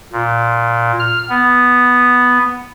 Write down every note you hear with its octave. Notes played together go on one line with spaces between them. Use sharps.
A#2
F6
B3